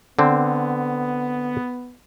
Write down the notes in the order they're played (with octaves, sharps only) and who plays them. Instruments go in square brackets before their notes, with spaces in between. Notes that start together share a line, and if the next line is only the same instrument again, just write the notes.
[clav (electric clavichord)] D3 C4 [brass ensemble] B3